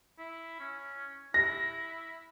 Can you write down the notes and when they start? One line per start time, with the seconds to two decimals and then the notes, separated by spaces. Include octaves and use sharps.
0.18 E4
0.60 C#4
1.34 E4 A#6